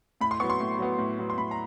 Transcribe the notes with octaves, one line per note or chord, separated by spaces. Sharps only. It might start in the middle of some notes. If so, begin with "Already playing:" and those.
A2 B5
C6
F#3 B3 C#6
C6
A2
F#3 B3
A2
F#3 B3
C6
A2 B5
A#5